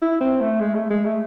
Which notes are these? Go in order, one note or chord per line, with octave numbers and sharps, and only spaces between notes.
E4
C4
A3
G#3
A3
G#3
A3